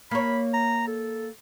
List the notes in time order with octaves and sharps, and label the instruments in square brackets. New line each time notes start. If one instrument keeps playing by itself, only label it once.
[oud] A#3 C#5 [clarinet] B5
[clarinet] A#5
A4